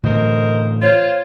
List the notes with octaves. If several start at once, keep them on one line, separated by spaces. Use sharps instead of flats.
A2 D3 E3 A#4 C5 D#5
F4 C5 C#5